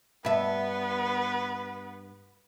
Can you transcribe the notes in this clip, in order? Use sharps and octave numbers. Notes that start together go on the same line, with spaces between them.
G2 B3 B4 E5